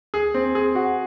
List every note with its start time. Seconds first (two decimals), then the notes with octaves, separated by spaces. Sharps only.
0.14 G#4
0.34 C4
0.55 G#4
0.75 F#4